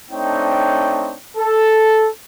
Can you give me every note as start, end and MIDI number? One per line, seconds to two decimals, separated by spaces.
0.11 1.16 57
0.11 1.16 60
0.11 1.16 62
0.11 1.16 63
0.11 1.16 73
0.11 1.16 79
1.37 2.07 69